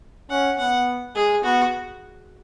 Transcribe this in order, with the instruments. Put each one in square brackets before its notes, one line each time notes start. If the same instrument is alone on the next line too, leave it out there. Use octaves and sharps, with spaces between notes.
[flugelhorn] C#4 [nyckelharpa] F#5
[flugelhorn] B3 [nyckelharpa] F#5
[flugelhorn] G#3 [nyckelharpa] G#4
[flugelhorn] B3 [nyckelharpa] F#4